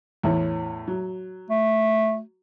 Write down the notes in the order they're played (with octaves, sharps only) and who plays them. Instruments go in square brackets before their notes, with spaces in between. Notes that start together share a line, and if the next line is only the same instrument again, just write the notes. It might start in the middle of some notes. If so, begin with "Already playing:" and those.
[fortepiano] E2 A2
F#3
[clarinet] A3